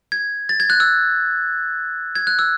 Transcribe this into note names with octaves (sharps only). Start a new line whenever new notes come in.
G#6
A6
G#6
F#6
E6
G#6
F#6
E6